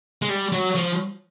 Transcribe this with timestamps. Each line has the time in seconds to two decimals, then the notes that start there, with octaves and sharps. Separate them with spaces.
0.22 G#3
0.29 G3
0.52 F#3
0.75 F3